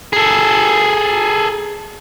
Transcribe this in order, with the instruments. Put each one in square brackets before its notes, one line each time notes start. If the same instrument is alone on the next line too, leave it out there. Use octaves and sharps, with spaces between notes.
[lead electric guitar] G#4 A4